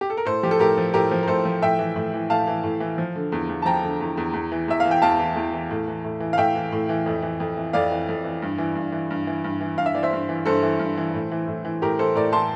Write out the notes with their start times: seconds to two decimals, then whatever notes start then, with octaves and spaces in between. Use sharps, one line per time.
0.01 G4
0.10 A4
0.17 A#4
0.25 A2 A4 C5
0.43 F3 G4
0.51 A4
0.59 A2 G4 A#4
0.78 F3
0.93 A2 G4 A#4
1.11 F3
1.23 A#4
1.28 A2 A4 C5
1.45 F3
1.62 A2 E5 G5
1.79 E3
1.96 A2
2.14 E3
2.30 A2 F5 A5
2.47 E3
2.63 A2
2.80 E3
2.98 F3
3.16 D3
3.32 E2
3.49 E2
3.62 A5
3.65 F3 G5 A#5
3.84 D3
4.00 E2
4.17 E2
4.33 E2
4.52 E3
4.68 E2 E5
4.80 F5
4.85 E3
4.91 G5
5.02 E2 F5 A5
5.19 E3
5.36 E2
5.53 E3
5.71 A2
5.88 E3
6.04 A2
6.20 E3
6.33 F5
6.37 A2 E5 G5
6.55 E3
6.72 A2
6.89 E3
7.06 F2
7.23 E3
7.40 F2
7.57 E3
7.73 F2 D5 F5
7.91 E3
8.09 F2
8.24 E3
8.42 G2
8.58 E3
8.75 G2
8.92 E3
9.10 G2
9.27 E3
9.44 G2
9.61 E3
9.78 G2 F5
9.86 E5
9.94 E3 D5
10.03 C5 E5
10.13 G2
10.29 E3
10.45 G2 A4 C5
10.63 E3
10.79 G2
10.97 E3
11.13 A2
11.31 E3
11.48 A2
11.65 E3
11.82 A2 G4 A#4
11.99 E3 A4 C5
12.15 A2 A#4 D5
12.32 E3 A5 C6